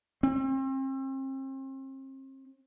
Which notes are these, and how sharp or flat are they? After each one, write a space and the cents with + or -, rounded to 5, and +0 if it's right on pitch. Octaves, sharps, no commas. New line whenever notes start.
C4 +40